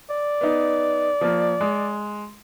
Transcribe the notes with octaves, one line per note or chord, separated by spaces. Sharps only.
D5
B3 D#4
F3 A#3
G#3